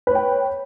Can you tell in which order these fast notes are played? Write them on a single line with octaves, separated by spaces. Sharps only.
B4 C#5 G5